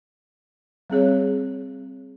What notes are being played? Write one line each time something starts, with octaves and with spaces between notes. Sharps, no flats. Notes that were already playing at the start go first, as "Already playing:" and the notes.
G3 C4 G#4 C#5